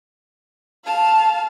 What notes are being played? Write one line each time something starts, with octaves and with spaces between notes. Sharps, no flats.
F5 A5